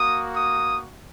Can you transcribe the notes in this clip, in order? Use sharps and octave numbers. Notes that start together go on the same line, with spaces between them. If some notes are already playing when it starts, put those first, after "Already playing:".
Already playing: A#3 F#4 D#6
D#6